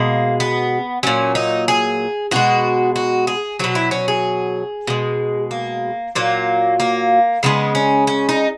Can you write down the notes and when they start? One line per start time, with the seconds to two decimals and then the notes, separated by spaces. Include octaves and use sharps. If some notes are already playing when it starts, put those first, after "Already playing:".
Already playing: B2 G#3 A#3
0.40 B3
1.03 A#2 F#3 C#4
1.35 D#4
1.68 G#4
2.31 B2 G#3 F#4
2.96 F#4
3.27 G#4
3.59 B2 F#3 F#4
3.75 E4
3.91 C#4
4.08 G#4
4.87 B2 G#3
5.51 A#3
6.15 A#2 F#3 A#3
6.80 A#3
7.43 C#3 E3 G#3 B3
7.75 C#4
8.07 C#4
8.29 D#4